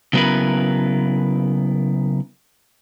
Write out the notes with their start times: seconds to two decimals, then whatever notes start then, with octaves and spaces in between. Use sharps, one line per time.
0.13 C#3 F#3 B3 E4 A#4 B4